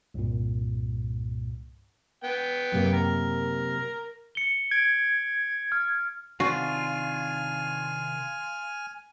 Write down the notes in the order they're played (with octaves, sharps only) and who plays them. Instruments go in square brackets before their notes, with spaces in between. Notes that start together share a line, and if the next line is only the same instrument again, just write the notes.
[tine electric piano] C2 G2 A#2
[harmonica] B3 G5
[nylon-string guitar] F#2 C3 A#3
[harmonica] A#4
[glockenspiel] C#7 G7
[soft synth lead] G#6 [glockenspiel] D7
[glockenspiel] F6
[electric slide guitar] C3 D#3 D4 [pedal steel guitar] F4 [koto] F#4 [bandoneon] G#5 F6